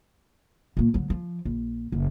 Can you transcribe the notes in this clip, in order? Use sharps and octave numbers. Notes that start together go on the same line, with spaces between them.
A#2 A#3
D3 F#3
F3
A#1
F#1